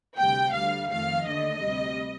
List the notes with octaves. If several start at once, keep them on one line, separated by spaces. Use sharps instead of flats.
D2 C3 G3 G5
D2 D3 G3 F5
F2 D#3 A3 F5
D#2 D3 A3 D#5
D2 C3 G3